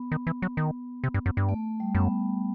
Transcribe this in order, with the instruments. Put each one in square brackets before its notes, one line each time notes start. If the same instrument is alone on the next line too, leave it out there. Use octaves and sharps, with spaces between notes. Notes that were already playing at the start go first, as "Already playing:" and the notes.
Already playing: [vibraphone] B3
[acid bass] D#3
E3
F#3
D#3
C3
G2
F#2
G2
[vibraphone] A3
G3
[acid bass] F#2 [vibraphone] B3